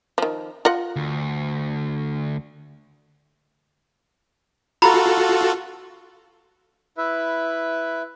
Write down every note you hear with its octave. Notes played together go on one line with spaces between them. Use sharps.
D#3 F3
F4 D#5 F#5
D2
F4 F#4 A4 A#5 B5
E4 B4 E5